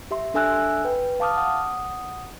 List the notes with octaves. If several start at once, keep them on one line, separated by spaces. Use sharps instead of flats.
G4 E5 C6
D4 A4 E5 G#5 E6 F#6
B4 G5
F5 A5 D6 D#6 F6
F#5 D#6